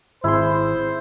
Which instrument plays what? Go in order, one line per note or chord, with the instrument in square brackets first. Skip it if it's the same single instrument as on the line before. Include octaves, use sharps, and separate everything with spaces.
[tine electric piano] G#1 G#4 C6 [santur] E4 [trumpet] C5